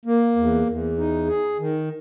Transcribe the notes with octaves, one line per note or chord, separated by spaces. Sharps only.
A#3
E2
E2
D#4
G#4
D#3